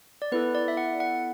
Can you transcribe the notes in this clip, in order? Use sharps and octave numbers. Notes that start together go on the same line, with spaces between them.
D5
B3 E4 A4 B4
D5
E5
F#5
F#5